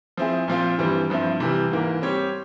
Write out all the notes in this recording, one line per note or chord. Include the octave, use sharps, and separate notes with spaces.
F3 C4 E4 G#4
A#2 F3 C4 F4
G2 E3 G3 C4
G2 F3 C4 E4
C3 E3 G3
G#2 E3 A#3
G3 C4 G4 C#5